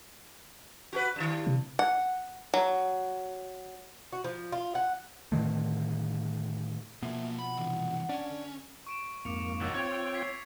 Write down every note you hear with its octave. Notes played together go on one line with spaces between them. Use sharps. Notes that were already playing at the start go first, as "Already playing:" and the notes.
F#4 G#4 B4
G2 D#3
C3
F#5
F#3
F#4
F3
F4
F#5
A2 D3 D#3 A3
B2 F3 A#3 G#4 E5
F#5 B5
C3 E3
C#4 D4
D3
C#6 D7 E7
F2 G#2 A#3 D6 C#7 F7
D#3 F#3 F#4 E6 A6
C4 F4 C#5 G5 F7
G#6 B6 C7